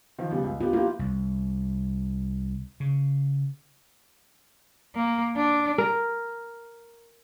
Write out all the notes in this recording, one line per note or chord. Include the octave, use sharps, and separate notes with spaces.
D#3 F3
C#3 G3 B3
C#2
B3 F4 G4
A#3 B3 E4 F4 G4
C2
C#3
A#3
D4
A#4